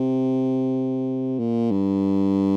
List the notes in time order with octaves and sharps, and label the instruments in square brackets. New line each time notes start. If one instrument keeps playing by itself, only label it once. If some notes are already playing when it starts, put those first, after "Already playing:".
Already playing: [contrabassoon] C3
A#2
G2